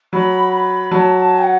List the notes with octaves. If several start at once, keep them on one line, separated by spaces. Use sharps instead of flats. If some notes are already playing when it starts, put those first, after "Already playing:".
F#3 B5
B5
F#3 A5
A5
G5
F#5